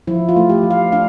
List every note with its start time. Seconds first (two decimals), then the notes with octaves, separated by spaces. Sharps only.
0.07 F3 E4
0.29 F4
0.36 A3
0.50 G4
0.63 F3
0.70 F5
0.92 D4 F5